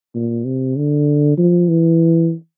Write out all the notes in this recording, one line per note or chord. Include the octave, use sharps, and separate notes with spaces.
A#2
C3
D3
F3
E3